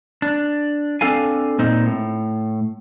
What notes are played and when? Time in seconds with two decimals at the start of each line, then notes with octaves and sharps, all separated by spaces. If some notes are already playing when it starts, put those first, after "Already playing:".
0.22 D4
1.01 C4 D4 A4 F5 G#5
1.59 A#2 C4 D#4
1.86 A2